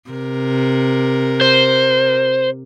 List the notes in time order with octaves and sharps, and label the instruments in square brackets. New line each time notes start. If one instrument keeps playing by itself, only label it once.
[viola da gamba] C3 A#4
[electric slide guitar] C5